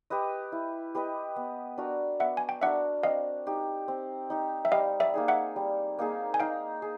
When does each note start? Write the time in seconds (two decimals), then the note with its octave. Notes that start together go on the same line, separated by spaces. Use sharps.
0.10 G4 B4 D#5
0.52 E4
0.95 G4 B4 D#5
1.36 B3
1.78 D4 F#4 A#4
2.20 B3 E5 F#5
2.37 G#5
2.49 G5
2.61 D4 F#4 A#4 E5 F#5
3.03 C4 D#5 F5
3.46 D#4 G4
3.88 C4
4.30 D#4 G4
4.65 E5
4.72 G3 D#5 F5
5.00 D5 E5
5.14 A#3 D#4 G#4
5.28 E5 F#5
5.56 G3
5.99 A#3 D#4 G#4
6.34 G#5
6.40 D#4 F5 G5
6.82 G#4